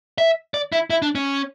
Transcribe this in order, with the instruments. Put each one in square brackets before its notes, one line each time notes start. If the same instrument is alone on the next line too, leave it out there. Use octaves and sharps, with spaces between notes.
[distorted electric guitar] E5
D5
E4
E4
D4
C#4